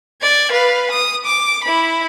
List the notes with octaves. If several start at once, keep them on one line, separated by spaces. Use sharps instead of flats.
D5 G#6
B4 F5
D#6
D6
E4 B5